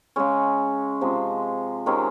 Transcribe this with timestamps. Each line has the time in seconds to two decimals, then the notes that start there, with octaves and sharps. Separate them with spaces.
0.16 C#3 G#3 C#4
1.01 C3 F3 G#3
1.86 C3 D#3 G#3 C#4